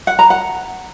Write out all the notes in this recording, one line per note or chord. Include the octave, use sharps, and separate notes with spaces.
F#5
A#5
F#5